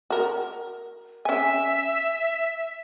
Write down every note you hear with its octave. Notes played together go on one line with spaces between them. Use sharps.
F#4 A#4
C#4 E5 G#5